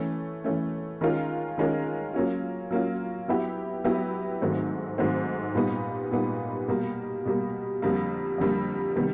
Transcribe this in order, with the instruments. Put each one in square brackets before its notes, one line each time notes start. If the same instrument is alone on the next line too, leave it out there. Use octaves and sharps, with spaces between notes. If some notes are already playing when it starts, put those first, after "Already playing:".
Already playing: [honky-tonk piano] E3 A3 C#4
E3 A3 C#4
D#3 G#3 C#4 F4 A#4
D#3 G#3 C#4 F4 A#4
F#3 A#3 C#4 F4
F#3 A#3 C#4 F4
F#3 B3 E4 G4
F#3 B3 E4 G4
G#2 D#3 F#3 A3 C4
G#2 D#3 F#3 A3 C4
A#2 G3 B3 D#4
A#2 G3 B3 D#4
B2 G3 A#3
B2 G3 A#3
F2 D3 G3 A#3
F2 D3 G3 A#3
C3 D#3 G3 B3